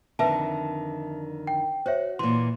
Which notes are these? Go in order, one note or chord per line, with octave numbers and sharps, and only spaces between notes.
F2 D3 D#3 B4 E5 A5
G5
F#4 C5 C#5 E5
A#2 E3 C6